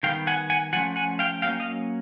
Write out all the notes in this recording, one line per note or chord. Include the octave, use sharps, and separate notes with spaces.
D#3 G3 B3 F5 G5
F#5 G#5
F#5 G#5
F3 A3 C#4 F#5 G#5
F#5 G#5
F5 G5
F#3 A#3 C#4 F5 G5
D#5 F5